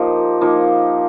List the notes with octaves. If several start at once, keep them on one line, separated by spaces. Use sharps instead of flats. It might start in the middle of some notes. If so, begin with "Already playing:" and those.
Already playing: F3 A#3 D#4 G4
F3 A#3 D#4 G4